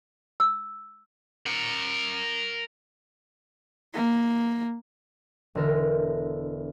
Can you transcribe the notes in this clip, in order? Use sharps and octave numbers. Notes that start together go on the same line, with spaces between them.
E6
A#4 F#5
A#3
E1 D3 A#4 E5